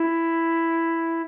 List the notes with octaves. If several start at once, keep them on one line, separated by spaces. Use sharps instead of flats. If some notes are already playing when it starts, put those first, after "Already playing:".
Already playing: E4